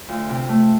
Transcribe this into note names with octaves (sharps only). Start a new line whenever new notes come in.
D2 F4
C3
A3